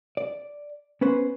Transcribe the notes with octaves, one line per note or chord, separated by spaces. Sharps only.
D5
B3 C#4 B4 C5